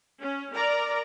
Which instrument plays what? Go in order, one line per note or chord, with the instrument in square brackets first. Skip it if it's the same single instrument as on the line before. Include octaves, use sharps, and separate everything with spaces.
[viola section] C#4
A#4 D5 A#5